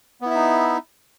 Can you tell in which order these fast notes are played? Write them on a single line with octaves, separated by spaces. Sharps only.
B3 E4 E5 D#4